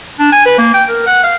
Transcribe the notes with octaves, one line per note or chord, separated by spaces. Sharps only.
D4
G#5
B4
A#3
G5
A#4
F#5
F5